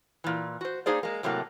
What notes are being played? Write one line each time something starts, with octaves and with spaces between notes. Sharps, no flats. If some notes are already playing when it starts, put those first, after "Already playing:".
A#2 E3
F#4 C5
A#3 D4 D#4 G#4 C5 D5
G#3 A#3
A2 C3 F#3 A3 A#3